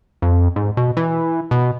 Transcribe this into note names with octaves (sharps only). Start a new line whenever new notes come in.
F2
G#2
B2
E3
B2